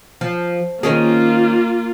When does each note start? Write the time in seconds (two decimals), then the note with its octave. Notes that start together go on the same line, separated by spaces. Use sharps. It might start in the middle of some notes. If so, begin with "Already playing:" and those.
0.21 F3
0.83 D#3 A#3 C#4 F4 G#4